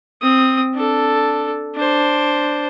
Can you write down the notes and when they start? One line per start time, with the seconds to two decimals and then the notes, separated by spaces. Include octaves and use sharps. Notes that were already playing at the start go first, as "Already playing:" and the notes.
0.22 C4 D#6
0.75 D4 A4
1.76 D4 C5